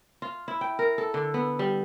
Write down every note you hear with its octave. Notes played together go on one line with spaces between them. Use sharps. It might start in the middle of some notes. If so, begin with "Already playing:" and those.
F4
E4
G5
A#4
A4
D3
B3
G3